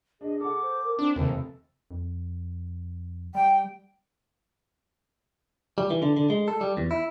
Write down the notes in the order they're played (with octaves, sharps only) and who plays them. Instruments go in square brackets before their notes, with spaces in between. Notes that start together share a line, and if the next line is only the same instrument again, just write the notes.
[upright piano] D4 [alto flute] G#4 [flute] D#5
[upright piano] A4 F#5 [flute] D6
[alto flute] C5
A#4
[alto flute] C4 [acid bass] D4
[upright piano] F1 [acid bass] D#2 [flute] A4
[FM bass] F2
[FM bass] G3 [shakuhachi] G5
[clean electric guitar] G3
E3
D3
D3
G#3
A4
G3
E2
E4